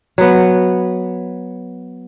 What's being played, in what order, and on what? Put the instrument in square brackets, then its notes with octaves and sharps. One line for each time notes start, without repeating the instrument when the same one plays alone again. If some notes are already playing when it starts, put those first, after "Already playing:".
[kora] F#3 B3